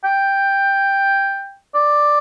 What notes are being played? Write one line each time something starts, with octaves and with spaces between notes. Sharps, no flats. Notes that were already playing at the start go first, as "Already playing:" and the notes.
G5
D5